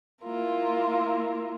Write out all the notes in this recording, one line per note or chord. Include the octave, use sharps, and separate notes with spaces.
A#3 E4 F4 A#4